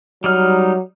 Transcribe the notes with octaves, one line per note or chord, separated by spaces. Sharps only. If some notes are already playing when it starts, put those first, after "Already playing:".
F#3 G3 D#4 F6